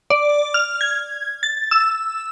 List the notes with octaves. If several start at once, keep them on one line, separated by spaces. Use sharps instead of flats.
D5
F6
G#6
A6
E6